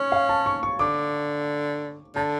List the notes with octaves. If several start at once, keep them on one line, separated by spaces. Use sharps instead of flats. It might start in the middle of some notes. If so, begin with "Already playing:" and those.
Already playing: C#4 C#5
F5
A5
C#6
C#6
D3 D6
D3 A5